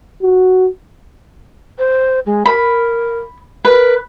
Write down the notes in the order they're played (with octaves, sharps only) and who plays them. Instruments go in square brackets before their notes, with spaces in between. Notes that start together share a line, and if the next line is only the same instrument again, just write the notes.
[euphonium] F#4
[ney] C5
G#3
[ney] A#4 [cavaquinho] B5
[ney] A#4 [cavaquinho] B4